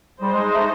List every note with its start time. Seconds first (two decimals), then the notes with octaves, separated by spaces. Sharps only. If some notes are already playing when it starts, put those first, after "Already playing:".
0.22 G3 D#4 G#4 C5 D#5
0.32 G#3
0.43 G#3
0.53 A3